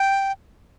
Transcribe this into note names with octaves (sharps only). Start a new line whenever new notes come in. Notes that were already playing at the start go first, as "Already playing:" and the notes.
Already playing: G5